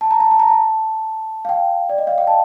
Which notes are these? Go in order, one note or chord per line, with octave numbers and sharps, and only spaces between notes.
A5
A#5
A5
A5
A#5
A5
F5
G5
D5
D#5
F5
G5
A5